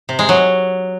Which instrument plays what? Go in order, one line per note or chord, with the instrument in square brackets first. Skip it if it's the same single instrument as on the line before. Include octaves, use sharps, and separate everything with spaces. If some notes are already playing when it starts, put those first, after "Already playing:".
[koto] C3
G#3
F#3